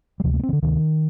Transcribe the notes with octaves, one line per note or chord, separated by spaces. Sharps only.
G3
D2 C3 F3
A3
A#3
C4
D#3
D3
D2 C3 D#3